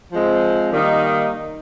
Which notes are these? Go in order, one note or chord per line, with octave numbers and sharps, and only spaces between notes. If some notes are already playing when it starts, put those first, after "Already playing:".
F3 G#3 C4
D#3 G3 A#3 D#4